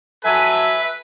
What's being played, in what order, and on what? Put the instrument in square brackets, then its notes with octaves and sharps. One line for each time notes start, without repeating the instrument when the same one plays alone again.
[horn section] F#3 A4 G#5 [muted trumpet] B4 [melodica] E5